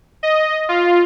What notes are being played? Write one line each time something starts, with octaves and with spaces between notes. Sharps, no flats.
D#5
F4